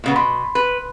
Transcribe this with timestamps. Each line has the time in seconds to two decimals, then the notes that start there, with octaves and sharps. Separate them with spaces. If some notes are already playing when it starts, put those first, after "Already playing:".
0.04 A#2 C#3 B3
0.16 B2 B5 C6
0.55 B4